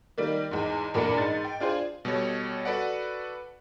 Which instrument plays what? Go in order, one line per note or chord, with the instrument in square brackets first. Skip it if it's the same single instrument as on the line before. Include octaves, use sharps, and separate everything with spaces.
[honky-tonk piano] D#3 G3 A#3
E2 G#2
E2 A#2 A#3 D4 B5 C#7
G#2 A6
G5
D4 F4 G#4 C5
[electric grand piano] B2 G3 A4 C#5
F#4 A4 B4 D5 F#5